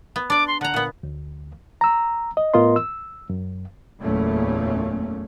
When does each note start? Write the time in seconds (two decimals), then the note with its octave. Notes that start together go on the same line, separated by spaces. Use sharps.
0.16 B3
0.30 D4 D5 D6
0.48 C6
0.61 D3 F#5 A#5
0.74 A#2 B3
1.03 D2
1.81 A#5 E6
2.37 D#5
2.54 A2 B3 F4 A#4 D#5 C6
2.76 E6
3.30 F#2
4.02 F#1 E2 A#2 A3 A#3 C#4